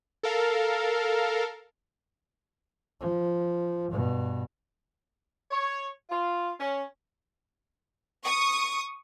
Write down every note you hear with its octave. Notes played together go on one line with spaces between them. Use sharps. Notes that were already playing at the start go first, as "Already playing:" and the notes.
A4 A#4 F5
F3
G2 B2
C#5
F4
C#4
C#6 D#6